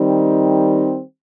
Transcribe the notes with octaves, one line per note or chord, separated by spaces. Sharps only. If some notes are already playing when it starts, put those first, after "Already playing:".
Already playing: D#3 G3 C4 D#4